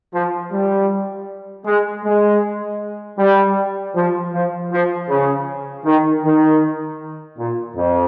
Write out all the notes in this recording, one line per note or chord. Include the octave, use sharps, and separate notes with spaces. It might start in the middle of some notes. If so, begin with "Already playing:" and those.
F3
G3
G#3
G#3
G3
F3
F3
F3
C#3
D#3
D#3
A#2
F2